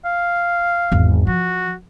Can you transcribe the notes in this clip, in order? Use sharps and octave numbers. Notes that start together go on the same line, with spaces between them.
F5
G#1 E2
F3 F#4